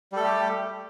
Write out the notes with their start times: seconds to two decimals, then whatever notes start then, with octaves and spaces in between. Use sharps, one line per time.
0.13 G3
0.16 A4
0.20 A3
0.24 G4